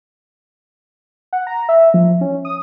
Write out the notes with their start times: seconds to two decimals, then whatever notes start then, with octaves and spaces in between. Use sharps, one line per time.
1.33 F#5
1.47 A#5
1.69 E5
1.94 F3
2.21 C#4
2.45 D#6